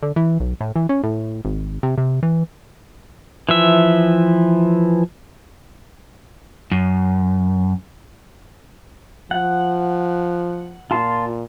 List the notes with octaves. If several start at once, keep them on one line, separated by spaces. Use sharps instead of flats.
D3
E3
B1
A2
E3
C#4
A2
G#1
C3
C3
E3
E3 F3 E5
F#2
F3 F#5
A#2 F4 A5 C6